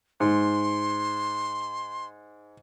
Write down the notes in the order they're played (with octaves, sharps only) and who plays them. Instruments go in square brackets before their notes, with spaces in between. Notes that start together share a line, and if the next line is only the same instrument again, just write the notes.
[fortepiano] G#2 [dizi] C6